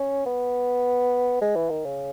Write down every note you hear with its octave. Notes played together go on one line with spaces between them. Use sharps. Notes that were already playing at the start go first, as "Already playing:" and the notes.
Already playing: C#4
B3
G#3
E3
D#3
C#3